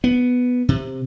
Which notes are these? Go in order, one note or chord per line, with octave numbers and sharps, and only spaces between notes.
B3
C3